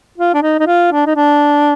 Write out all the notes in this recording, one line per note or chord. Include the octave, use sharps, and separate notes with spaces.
F4
D4
D#4
D#4
F4
D4
D#4
D4